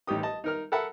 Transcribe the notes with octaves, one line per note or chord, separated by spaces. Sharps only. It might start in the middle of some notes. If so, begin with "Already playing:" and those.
A1 D#4 G4 D#6
D#5 A5
D#4 A#4 F6
A4 A#4 E5 F#5 A5 B5